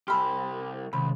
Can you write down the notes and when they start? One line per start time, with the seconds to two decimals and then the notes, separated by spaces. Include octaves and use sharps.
0.08 C2 G4 C5 G#5 B5 E6 F6
0.93 C#2 C3 D#3 B5 C6